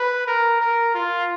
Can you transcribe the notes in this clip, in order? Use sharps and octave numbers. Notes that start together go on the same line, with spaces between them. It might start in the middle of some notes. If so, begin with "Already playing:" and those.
Already playing: B4
A#4
A#4
F4